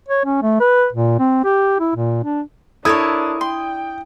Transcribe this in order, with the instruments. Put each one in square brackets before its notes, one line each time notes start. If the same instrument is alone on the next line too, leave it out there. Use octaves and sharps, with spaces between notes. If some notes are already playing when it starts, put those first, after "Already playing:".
[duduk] C#5
C#4
A3
B4
A#2
C4
G4
E4
A#2
D4
[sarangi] D4 [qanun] E4 [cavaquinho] A4 A#4 C#5 [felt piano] D#6 G#6
[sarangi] G5 [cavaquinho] C6